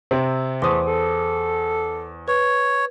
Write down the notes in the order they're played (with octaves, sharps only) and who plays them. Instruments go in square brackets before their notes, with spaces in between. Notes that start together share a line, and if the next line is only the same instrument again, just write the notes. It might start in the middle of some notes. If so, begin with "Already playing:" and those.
[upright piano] C3 C4
[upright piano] E2 D#6 [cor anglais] A3 [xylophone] C5 C6
[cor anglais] A4
[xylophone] B4 [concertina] C#5